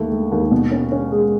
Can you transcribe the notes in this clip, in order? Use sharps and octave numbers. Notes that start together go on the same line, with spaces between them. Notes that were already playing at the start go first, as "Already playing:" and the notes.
Already playing: D#2 A3
A3
D#2
B2
C#4
C#4
G#3